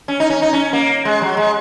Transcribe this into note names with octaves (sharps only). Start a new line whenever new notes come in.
C#4
D#4
C#4
D#4
C#4
A#3
G#3
F#3
G#3